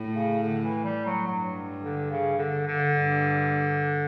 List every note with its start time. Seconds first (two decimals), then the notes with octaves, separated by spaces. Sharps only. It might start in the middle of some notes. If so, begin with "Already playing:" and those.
Already playing: A2
0.15 C#3
0.43 D3
0.64 E3
0.84 G3
1.06 F#3
1.27 G2 F#3
1.83 D3
2.11 C#3
2.38 D3
2.67 D3
2.95 G2